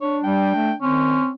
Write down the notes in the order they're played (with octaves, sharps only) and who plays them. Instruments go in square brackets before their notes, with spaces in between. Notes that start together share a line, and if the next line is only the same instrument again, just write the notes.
[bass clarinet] D4 [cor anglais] C#5
[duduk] G3 [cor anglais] G5
[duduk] A3
[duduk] D#3 [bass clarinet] C4 [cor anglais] C#4